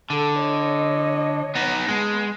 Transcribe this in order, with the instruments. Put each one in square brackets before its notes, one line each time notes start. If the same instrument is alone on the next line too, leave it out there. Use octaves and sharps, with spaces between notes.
[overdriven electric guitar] D3 [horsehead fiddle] A4
[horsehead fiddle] C#5 D#5
[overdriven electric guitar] B3 D#4
[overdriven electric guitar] G#3 [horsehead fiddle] B3 A5